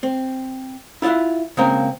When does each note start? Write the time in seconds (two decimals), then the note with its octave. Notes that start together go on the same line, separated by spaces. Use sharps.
0.03 C4
1.02 E4 F4 D5 E5 F#5
1.57 C#3 G#3 A#3 C4 A#4